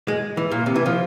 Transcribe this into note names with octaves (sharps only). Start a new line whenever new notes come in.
G#3
E3
A#2
C3
E3
F3